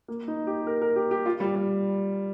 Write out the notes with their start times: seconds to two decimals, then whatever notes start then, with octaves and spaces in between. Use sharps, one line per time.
0.08 A#3
0.28 D#4
0.47 G4
0.67 A#4
0.82 A#4
0.96 G4
1.11 G4
1.26 F4
1.40 G3
1.55 G3